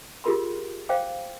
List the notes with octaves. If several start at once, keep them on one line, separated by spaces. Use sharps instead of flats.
F4 G4 G#4 A#4 B5 C6
C5 F5 G5 D6